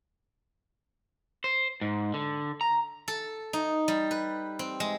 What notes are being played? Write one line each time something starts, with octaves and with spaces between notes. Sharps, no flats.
C5
G#2
D3
A#5
A4
D#4
G3
B4
C4
G#3